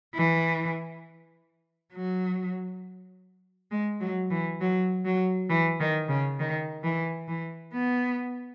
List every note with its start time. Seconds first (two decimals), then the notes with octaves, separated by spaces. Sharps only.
0.15 E3
1.93 F#3
3.71 G#3
4.00 F#3
4.31 E3
4.60 F#3
5.05 F#3
5.50 E3
5.80 D#3
6.09 C#3
6.39 D#3
6.83 E3
7.28 E3
7.73 B3